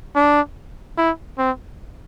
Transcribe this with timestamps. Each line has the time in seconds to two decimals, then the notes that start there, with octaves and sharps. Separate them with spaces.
0.16 D4
0.98 E4
1.38 C4